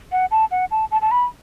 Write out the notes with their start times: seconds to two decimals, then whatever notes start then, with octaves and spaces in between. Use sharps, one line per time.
0.12 F#5
0.31 A5
0.51 F#5
0.71 A5
0.91 A5
1.01 A5
1.11 B5